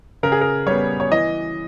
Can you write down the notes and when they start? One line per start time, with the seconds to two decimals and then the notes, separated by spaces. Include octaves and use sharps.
0.23 C#3 A#4
0.32 G#4
0.41 A#4
0.66 G3 B3 C#5
1.00 C#5
1.11 E3 D#5